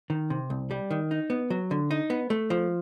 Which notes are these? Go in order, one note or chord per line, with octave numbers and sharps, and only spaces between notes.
D#3
C3
C2
G3
D#3
D#4
B3
F#3
D3
D#4
B3
A3
F3